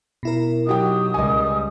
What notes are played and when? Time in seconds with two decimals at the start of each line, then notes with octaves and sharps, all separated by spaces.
0.23 B2 E4 A#4
0.67 F#3 D#4 G4 G5 D#6
1.14 C#2 G3 D#5 G#5